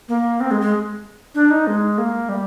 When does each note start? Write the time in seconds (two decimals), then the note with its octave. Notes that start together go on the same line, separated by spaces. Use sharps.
0.09 A#3
0.40 C4
0.51 G#3
0.61 G#3
1.35 D4
1.51 D#4
1.67 G#3
1.98 A#3
2.29 G3